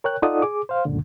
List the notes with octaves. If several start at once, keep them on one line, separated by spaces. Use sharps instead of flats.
A#4 C#5 G5 F#6
D#4 F4 A4 D5 F#5 D#6
G#4 D6
C5 F5
C#2 F#2 A#2 D3